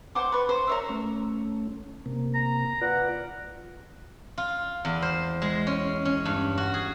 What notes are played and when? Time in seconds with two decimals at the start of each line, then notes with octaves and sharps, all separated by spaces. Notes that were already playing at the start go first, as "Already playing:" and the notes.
0.15 C5 F#5 C6 D6
0.32 B4 C#6
0.49 C5
0.67 A#4 C#5 E5
0.89 A3 C#4
2.06 C3 A#3
2.34 A#5
2.82 F4 B4 D5 F#5
4.38 F4
4.85 E2
5.02 C5
5.42 G#3
5.67 C#4
6.05 C#4
6.25 G2
6.58 F#4
6.74 G#4